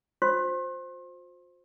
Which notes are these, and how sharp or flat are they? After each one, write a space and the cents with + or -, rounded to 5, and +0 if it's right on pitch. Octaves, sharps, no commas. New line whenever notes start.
F4 +45 C5 +0 C6 +40